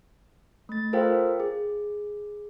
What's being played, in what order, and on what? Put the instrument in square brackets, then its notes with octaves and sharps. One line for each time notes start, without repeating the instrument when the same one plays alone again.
[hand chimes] A3 A6
F4 A4 A#4 C5 F5 G5
G#4